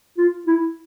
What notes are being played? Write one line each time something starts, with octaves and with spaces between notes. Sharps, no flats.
F4
E4